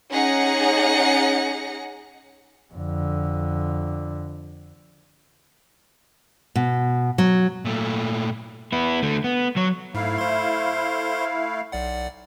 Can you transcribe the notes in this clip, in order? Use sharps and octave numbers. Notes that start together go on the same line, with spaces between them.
C#4 D#4 G#4 F#5 A#6 C#7
F2 D3
B2
F#3
A#2 A3
B3 E4
D3 A3
B3
F#3 C#5
G#2 A3 E4 F5
C5 C6
B1 D5 F#5